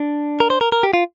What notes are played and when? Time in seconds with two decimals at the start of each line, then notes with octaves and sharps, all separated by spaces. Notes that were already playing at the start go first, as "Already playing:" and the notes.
Already playing: D4
0.40 A#4
0.50 C5
0.61 A#4
0.72 A#4
0.83 G4
0.93 F4